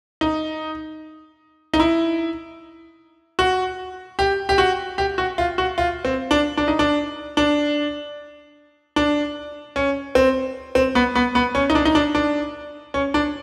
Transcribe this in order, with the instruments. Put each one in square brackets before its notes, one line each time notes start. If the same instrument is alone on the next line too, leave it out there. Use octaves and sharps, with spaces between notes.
[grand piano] D#4
D#4
E4
F#4
G4
G4
F#4
G4
F#4
F4
F#4
F4
C4
D4
D4
D#4
D4
D4
D4
C#4
C4
C4
B3
B3
B3
C#4
D#4
D4
D#4
D4
D4
C#4
D4